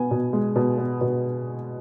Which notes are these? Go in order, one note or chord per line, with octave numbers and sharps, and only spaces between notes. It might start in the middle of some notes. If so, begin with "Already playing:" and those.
Already playing: B2 B3 G#5
B2
G#3
B2
B3
B2